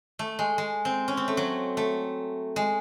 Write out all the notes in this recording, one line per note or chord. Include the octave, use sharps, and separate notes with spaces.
A3
G#3
G#3
C4
C#4
C4
A3
F#3
A3
G#3